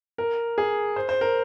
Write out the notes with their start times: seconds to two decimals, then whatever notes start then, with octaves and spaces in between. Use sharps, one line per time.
0.18 A#4
0.58 G#4
0.96 C5
1.09 C5
1.21 A#4